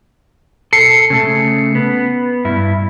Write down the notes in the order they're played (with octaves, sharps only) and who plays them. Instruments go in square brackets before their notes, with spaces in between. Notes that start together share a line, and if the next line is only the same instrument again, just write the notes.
[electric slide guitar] A4 [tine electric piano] C7 C#7
[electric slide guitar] C#3 A3
B3
G2 E4